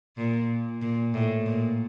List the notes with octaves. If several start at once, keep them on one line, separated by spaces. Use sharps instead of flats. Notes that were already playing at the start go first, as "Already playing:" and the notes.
A#2
A#2
A2
A#2